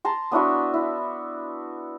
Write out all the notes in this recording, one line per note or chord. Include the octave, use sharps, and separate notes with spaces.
A5 A#5 C6
B3 D4 E4 F#4
E4